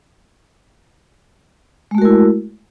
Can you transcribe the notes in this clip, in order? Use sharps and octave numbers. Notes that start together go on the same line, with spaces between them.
G#3 A3 E4 F#4 A#4